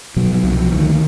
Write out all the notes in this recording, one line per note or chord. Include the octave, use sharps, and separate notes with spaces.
B2 F#3
F#3
C2
F3
D2 D#3